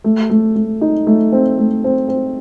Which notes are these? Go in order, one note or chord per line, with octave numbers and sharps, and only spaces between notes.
A3
A3
A3
D#4
A3
C4
A3
C4
C4